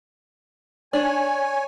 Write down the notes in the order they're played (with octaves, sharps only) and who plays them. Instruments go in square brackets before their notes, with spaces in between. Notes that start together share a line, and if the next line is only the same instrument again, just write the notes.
[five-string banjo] D4 [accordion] C#5 G#5